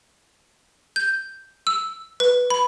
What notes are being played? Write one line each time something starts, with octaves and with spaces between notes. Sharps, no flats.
G6
E6
B4
B5